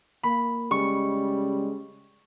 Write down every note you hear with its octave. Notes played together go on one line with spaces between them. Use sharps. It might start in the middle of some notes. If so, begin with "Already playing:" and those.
A#3 B5
C#3 G3 G#3 C#6